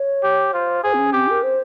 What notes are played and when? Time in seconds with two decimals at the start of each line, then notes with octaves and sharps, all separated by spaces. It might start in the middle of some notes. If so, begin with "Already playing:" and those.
Already playing: C#5
0.23 G4
0.53 F4 C5
0.84 G#4 C5
0.94 C4
0.98 C#4
1.13 C4 G4
1.29 A#4
1.43 C5